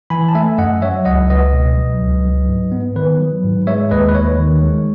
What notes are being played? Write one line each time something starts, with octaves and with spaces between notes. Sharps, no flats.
E3 G#5 B5
A5
A3 E5 G#5
F#2 D#5 F#5
F#3 C#5 E5
C#2 D#5 F#5
C#2 B4 D#5
B2
F#3
C#2
F#3
G#2
B3
D#3 B4
F#3
G#2
G#3 C#5 E5
D#2 B4 D#5
B4
D#2 C#5
D#3
G#3